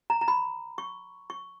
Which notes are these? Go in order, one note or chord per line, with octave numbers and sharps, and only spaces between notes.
A#5
A#5
B5
C#6
C#6